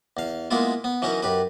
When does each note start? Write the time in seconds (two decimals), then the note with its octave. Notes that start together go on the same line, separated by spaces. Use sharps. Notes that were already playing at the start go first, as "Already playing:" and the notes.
0.17 E2 F5
0.51 G#3 A#3 B3 E4 F4
0.84 B3
1.02 E3 F#3 C#4 D#4 A#4
1.23 F#2 G4 B4